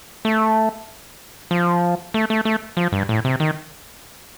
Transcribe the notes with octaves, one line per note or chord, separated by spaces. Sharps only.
A3
F3
A3
A3
A3
F3
G2
A2
C3
D#3